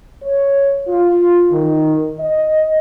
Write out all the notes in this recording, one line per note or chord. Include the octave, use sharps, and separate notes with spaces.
C#5
F4
D#3
D#5